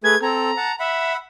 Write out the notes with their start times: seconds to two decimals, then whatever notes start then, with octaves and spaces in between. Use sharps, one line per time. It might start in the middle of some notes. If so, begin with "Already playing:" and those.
0.04 A3 G#4 B4 G#6
0.22 C4 A4 A#5
0.57 F#5 A5
0.79 E5 F#5 B5